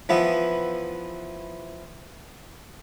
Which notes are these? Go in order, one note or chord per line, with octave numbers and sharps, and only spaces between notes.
E3 F3 B3 E4